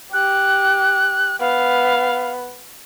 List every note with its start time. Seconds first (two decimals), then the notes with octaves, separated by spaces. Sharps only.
0.13 G4 F#6
1.40 B3 F5